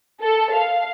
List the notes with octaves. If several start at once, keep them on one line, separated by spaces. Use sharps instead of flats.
A4
F5